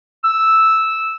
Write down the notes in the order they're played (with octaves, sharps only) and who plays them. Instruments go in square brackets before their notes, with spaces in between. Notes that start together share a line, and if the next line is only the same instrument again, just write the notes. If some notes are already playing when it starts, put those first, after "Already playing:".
[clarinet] E6